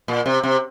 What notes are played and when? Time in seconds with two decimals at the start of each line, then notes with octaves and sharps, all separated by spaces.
0.08 A#2
0.26 C3
0.43 C3